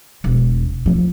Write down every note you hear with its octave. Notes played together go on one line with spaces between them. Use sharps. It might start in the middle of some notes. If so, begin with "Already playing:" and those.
E1
F3